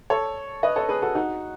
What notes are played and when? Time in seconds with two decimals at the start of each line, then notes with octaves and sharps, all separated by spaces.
0.10 A4 C#5
0.63 B4 D#5
0.76 A4 C#5
0.89 G#4 B4
1.02 F#4 A4
1.15 D#4 F#4